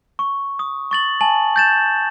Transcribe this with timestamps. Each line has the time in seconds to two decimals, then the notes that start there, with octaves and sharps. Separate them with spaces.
0.19 C#6
0.59 D#6
0.91 C#6 A6 F#7
1.21 G#5 A5 F#7
1.56 G6 A6 E7